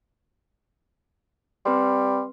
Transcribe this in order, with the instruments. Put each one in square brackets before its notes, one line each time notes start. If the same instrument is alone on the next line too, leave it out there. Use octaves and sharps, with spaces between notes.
[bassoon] G3 [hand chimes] C4 B4 C6